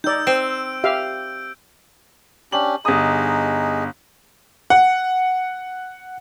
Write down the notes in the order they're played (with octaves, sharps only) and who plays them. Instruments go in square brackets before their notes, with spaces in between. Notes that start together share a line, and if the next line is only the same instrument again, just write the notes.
[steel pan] D#4 D5 [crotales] E6 G6
[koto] C4 C5 [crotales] D7
[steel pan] G4 E5 F5
[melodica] C#4 D4 G4 [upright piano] F#7
[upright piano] G1 D#6 [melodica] D#4 G#4 D#5
[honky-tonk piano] F#5